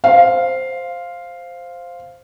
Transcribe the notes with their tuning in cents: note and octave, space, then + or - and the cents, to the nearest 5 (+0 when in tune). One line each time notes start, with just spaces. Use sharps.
C5 +0 F5 +0